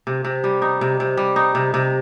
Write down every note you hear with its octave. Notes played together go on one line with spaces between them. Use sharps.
C3
C3
G3
D#4
C3
C3
G3
D#4
C3
C3